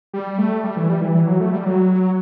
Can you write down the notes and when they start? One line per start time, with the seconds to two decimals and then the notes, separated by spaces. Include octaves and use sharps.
0.14 G3
0.38 A3
0.64 G3
0.77 E3
0.89 G3
1.02 E3
1.15 E3
1.27 F#3
1.40 A3
1.52 G3
1.65 F#3